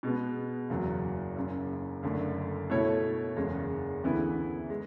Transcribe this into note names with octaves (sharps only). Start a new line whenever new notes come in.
B2 G#3 B3
F#1 E2 C#3 F#3
F#1 F#2 C#3
F#1 F#2 D3 A3
B2 A3 E4 A4 C#5
F#1 E2 C#3 G#3
D2 C#3 E3 B3 E4
G#3